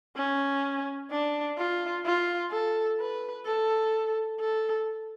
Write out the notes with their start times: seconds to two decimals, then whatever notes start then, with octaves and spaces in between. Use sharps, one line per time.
0.16 C#4
1.11 D4
1.57 F4
2.05 F4
2.51 A4
2.99 B4
3.45 A4
4.40 A4